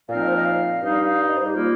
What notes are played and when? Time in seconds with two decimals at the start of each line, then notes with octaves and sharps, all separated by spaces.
0.09 A#2 F3 C4 D#4 A#4 F5
0.21 D#5
0.27 C5
0.36 D#5
0.45 F5
0.82 G2 G3 D#4
1.27 D#5
1.37 C5
1.46 G4
1.55 G3 A#3 F4